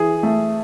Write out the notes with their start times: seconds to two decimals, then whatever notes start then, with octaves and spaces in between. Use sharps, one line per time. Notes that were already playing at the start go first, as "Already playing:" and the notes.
Already playing: E3 G#4
0.23 A3